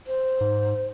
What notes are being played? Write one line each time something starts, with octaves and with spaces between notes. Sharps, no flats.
C5
G#2